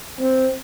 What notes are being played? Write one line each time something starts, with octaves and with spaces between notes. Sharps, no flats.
C4